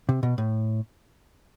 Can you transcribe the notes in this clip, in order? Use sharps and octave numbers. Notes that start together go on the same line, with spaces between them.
C3
B2
A2